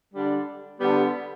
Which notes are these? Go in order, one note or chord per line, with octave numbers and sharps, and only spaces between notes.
D3 G3 D4
D3 G3 B3